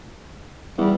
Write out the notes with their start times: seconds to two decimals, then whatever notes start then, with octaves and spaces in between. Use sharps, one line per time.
0.78 E2 G3